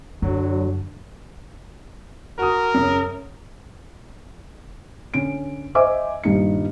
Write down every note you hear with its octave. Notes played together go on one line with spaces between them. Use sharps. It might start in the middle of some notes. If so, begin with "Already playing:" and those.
F#2 D3 F#3
F#4 A#4 D#6
F#2 C#3
D3 C#4 D7
C5 D#5 E5 G#5 D6
D#1 G2 D#4 C#7